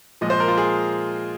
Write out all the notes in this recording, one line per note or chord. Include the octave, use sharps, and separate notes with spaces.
A#2 F3 G#3 D#5
C5
A#4
F4
G#4